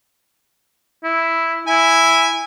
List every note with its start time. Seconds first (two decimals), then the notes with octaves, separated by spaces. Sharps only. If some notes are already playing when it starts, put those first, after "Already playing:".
1.04 E4
1.67 E4 G#5